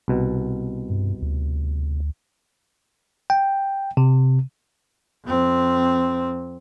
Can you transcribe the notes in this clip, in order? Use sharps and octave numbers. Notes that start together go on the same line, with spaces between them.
C2 B2
G2
D2
G5
C3
F2 C4